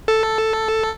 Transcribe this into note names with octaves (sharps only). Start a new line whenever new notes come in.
A4